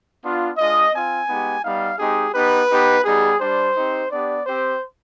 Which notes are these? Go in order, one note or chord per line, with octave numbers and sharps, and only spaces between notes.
B3 D4 F4
G#3 D4 F4 D#5
C4 F4 G#5
G#3 B3 D#4 G4
G3 B3 D#4 F5
G#3 C4 D#4 G4 G#4
B3 D#4 G4 B4
B3 D#4 G4
G3 B3 D#4 G4 G#4
G3 D4 G4 C5
C4 D#4 G4
B3 D4 G4 D5
C4 G4 C5